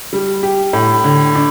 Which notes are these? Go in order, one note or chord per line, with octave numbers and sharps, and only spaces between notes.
G3
G4
A2
D3
D4